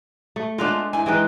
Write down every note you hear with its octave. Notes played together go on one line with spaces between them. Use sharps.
A3
G#3 A3 B3 D4 F4
G#2 E4 G#5
E3 G#3 D#4 B4 G5